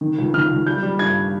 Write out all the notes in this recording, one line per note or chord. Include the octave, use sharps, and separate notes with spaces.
D#3
C#2
D#3 F6
C#2
G3 G6
G3
G2 G#6